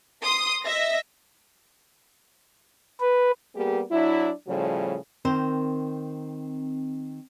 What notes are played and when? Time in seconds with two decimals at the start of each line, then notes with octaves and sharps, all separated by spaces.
0.24 C6 D#6
0.63 D#5 E5 A#6
3.00 B4
3.55 G3 A#3 B3 G4 G#4
3.90 F#3 D4 E4
4.48 A2 C#3 F3 G3
5.25 D#3 C4 A#4 C5